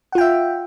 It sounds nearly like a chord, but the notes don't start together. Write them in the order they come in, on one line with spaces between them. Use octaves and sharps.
F#5 F4 G5 E5